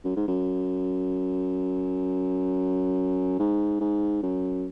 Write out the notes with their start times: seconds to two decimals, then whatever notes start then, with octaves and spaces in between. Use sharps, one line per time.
0.04 F#2
0.16 G#2
0.28 F#2
3.39 G#2
3.80 G#2
4.23 F#2